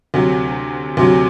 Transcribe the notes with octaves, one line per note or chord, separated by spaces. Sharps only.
D2 C3 F#3
D2 C3 F#3